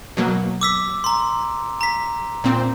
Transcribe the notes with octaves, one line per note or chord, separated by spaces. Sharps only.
B2 F#3 A#3
D6 E6 B6
A#5 C6
A#5 B6
A#2 C4